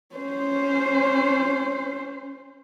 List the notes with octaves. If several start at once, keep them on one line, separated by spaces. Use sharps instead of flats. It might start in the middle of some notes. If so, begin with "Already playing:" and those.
C#4 C5